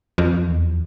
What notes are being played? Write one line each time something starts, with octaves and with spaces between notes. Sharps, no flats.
F2
E2